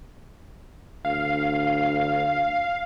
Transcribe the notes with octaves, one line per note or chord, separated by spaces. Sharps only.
D2 F5